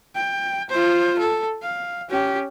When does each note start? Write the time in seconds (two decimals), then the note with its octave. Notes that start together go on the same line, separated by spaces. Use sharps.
0.15 G5
0.70 F4 C5
1.19 A4
1.62 F5
2.10 C#4 G4